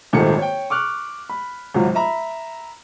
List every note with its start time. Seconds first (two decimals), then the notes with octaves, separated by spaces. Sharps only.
0.13 D#1 G#1 D#3 A3 C#7
0.38 C#5 G5
0.70 C#6 D6 F6 F#6
1.29 B5
1.74 G#1 C#2 F#3 F4
1.95 E5 A#5 B5